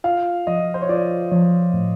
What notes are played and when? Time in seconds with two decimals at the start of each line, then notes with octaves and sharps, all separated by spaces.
0.04 F4 F5
0.47 F3 D#5
0.74 C5
0.82 C#5
0.89 F4 D5
1.31 F3 C#5
1.74 A2